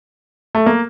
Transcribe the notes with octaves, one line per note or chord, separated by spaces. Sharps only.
A3
A#3